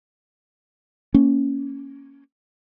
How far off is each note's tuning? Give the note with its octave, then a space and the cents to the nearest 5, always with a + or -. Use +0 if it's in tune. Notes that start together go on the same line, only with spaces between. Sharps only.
A#3 +0 C#4 +0